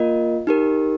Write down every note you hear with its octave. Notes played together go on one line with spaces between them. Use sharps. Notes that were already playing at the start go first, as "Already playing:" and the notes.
Already playing: A#3 F4 A#4 D#5
D#4 G4 A#4